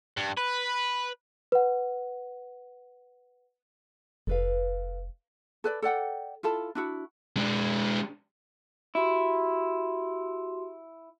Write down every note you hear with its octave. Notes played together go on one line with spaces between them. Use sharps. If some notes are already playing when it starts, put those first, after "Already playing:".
G2
B4
B4 F#5
F1 A4 B4 F5
A4 B4 D5
A4 D5 F#5 G5
E4 F4 A4 A5
D4 E4 F#4
G#3 D4
E4 F#4 G4 C6